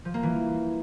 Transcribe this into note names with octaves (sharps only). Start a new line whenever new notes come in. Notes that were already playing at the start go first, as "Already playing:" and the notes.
F3
A#3
E3